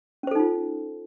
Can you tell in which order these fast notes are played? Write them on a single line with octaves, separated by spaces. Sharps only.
C#4 C5 A4 D#4 F4